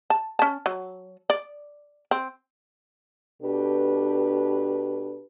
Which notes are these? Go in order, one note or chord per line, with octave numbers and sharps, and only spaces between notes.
A5
C#4 A5
F#3
D5
C4
B2 D4 G4 A4 B4